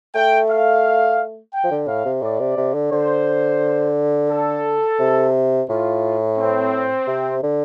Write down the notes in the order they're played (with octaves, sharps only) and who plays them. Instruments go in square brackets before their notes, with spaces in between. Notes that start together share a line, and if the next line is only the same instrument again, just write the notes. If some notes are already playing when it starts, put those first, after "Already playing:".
[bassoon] A3 [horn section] G5
[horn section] F5
G5
[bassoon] F3
D3
[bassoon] A2 [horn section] F5
[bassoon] C3
[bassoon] A2 [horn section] D5
[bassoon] C3
C3
D3
[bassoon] D3 [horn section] C5
[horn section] A4
[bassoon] C3
[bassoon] A2 [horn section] F4
[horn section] C4
[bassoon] C3
D3